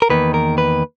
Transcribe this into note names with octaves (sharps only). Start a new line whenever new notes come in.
A#4
E2 D#3 A#3 B4
A#4
B4